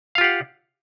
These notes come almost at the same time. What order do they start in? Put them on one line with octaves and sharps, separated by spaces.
F5 F4 G4 F#5